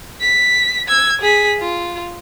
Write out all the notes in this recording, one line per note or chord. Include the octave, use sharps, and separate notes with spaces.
B6
E6 G#6
G#4 B6
F4